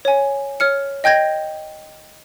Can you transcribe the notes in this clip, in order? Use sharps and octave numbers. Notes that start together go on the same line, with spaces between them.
C#5 G#5
C#5 F6 C#7
D#5 G5 G6 G#6 A#6